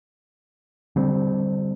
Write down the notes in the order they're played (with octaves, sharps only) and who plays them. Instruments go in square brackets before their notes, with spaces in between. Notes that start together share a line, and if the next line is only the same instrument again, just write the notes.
[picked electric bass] D3 G3 C4